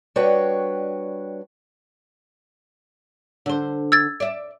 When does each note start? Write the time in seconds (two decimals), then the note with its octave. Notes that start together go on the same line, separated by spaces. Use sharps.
0.16 G3 D4 F#4 B4 C#5 G5
3.46 D3 C5
3.92 E6 G#6 A6
4.20 D5 E5